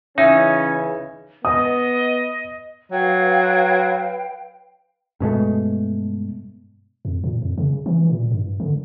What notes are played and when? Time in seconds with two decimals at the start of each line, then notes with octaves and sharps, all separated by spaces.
0.18 C#3 E3 C#4 D#4 E5
1.45 B3 D#5 D#6
2.92 F#3 B4 F5 G5
5.20 G2 B2 G#3 A3
7.05 F2
7.24 A#2
7.42 F2
7.58 C#3
7.86 E3
8.10 A#2
8.31 G2
8.60 D3